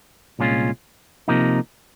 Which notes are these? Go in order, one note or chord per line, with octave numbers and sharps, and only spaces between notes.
C2 A#2 G#3 C#4 F4
C3 F3 A#3 D#4